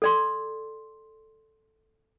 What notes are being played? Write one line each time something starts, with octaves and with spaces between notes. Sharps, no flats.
A4 D5 C6